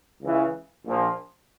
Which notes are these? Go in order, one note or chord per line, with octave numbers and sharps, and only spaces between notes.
C#2 C#3 E3
A#1 A#2 F3 A#3